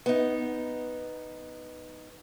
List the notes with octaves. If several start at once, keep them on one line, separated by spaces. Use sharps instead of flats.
B3 D#4